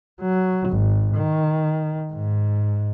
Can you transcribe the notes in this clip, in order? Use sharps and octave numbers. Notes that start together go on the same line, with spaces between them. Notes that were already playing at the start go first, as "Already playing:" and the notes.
F#3
G#1
D#3
G#2